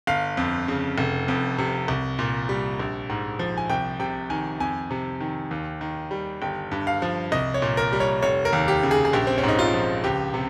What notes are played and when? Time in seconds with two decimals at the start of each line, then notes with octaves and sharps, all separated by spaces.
0.07 G1 F5
0.37 F2
0.68 C#3
0.98 F1
1.28 F2
1.58 C3
1.88 C2
2.19 A#2
2.49 G3
2.79 A#1
3.10 G#2
3.39 F3
3.57 G#5
3.70 C2 G5
4.00 C3 G5
4.30 D#3 G#5
4.60 F2 G#5
4.91 C3
5.20 D#3
5.51 D#2
5.81 D#3
6.11 G3
6.42 G1 G5
6.71 G2
6.87 F5
7.02 F3
7.32 C2 D#5
7.54 C#5
7.62 A#2
7.77 A#4
7.92 G3
8.00 C#5
8.22 F1 C#5
8.45 A#4
8.53 D#2
8.68 G4
8.83 C#3
8.91 G#4
9.05 G#4
9.13 A#1 G4
9.27 C4
9.38 C#4
9.43 G#2 D#4
9.59 F4
9.74 F3
10.04 C#2 G4
10.34 C3